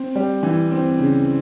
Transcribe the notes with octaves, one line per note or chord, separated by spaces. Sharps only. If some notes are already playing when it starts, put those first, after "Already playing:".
Already playing: C4
G3
E3
C4
C#3